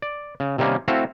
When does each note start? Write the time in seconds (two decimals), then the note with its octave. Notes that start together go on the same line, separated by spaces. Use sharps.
0.02 D5
0.40 C#3
0.58 C3 D#3 G3 A#3 C#4
0.88 A3 C4 E4 F#4 A4 F5